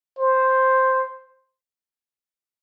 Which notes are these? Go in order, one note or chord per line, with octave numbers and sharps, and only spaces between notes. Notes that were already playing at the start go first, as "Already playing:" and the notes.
C5